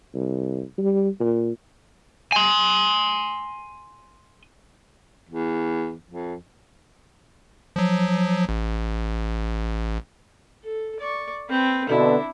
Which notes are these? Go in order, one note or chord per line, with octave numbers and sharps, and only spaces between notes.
C2
G3
A#2
G#5 C6
E2
F2
F3 F#3
A1
A4
D5 C#6
C4 B4
B2 D3 D4 E4